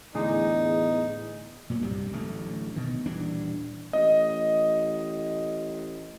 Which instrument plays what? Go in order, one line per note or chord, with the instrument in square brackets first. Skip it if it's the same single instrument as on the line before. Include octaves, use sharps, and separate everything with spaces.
[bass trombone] E2 [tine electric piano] A2 G#4 [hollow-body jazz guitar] D3 [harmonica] D#4
[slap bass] A#2 F#3
C2 G2 C3 G3
D1 A1 D3 A3
B2 D#3
D#1 E3 G3 D4
[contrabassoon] A1 [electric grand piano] D#5